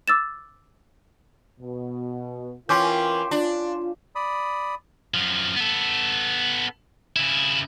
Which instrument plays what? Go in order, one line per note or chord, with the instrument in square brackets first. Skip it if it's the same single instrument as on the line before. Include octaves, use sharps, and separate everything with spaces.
[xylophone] D6 E6 A6 E7
[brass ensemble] B2
[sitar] E3 C#4 [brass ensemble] F4 A#4 G5 [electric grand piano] C6 D6 G6
[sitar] D4 [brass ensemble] F4
[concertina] D5 B5 D#6
[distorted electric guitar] F#2 F3
B3 A4
C#3 E4